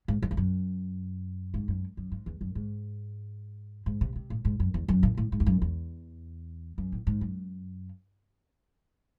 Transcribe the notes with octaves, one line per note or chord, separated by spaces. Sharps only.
G#2
F#2
E2
F#2
G#2
F#2
F#2
G#2
E2
F#2
G#2
G#2
C3
C3
A2
G#2
F#2
E2
F#2
A2
A2
G#2
E2
F#2
E2
F#2
A2
G#2
F#2